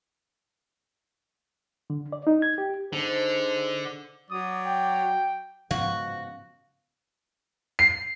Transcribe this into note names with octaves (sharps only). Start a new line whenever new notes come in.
D3
D5
D#4
G#6
G4
D3 D#4 G#4 C5
F#3 D5 D#6
G5
G#2 C#3 F3 B3 F#4 F5
C7